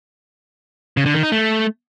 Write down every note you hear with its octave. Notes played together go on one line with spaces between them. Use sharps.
C#3
D3
D#3
D#4
A3